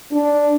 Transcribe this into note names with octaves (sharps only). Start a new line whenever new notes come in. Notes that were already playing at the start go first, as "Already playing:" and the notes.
D4